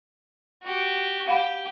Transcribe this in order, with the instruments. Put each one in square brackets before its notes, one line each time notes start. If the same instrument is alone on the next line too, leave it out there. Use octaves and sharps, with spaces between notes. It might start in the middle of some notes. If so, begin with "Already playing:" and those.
[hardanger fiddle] F#4 G4
[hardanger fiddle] G4 [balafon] F5 F#5 B5